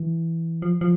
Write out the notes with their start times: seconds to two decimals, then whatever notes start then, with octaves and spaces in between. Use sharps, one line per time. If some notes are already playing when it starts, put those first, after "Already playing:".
Already playing: E3
0.62 F3
0.81 F3